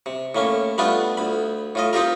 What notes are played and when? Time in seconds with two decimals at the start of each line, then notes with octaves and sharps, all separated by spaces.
0.06 C3
0.35 A2 A#3 C#4
0.78 G3 A3 B3 D4 F4
1.17 D2 B5
1.75 A2 F4 D#5
1.93 C4 D#4 F4 G4 A#4